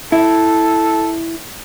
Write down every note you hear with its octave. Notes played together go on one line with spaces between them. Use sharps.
E4 A4